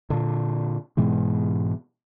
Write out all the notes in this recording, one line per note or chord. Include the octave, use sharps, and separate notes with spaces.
A#2 D3
G#2 B2 E3 G#3